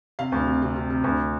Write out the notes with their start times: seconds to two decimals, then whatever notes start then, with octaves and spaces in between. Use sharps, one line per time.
0.19 C3 F5
0.32 D2
0.47 C3
0.62 C3
0.76 C3
0.90 C3
1.04 D2